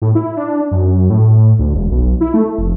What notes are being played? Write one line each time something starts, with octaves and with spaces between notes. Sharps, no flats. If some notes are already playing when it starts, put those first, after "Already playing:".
A2
E4
D4
F#2
A2
D2
E1
B1
E4
A3
F1